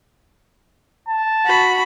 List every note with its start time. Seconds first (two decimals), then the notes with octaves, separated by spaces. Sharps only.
1.08 A5
1.46 F#4 B5